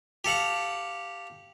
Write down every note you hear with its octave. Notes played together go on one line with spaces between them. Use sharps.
G4 A4 F5 F#5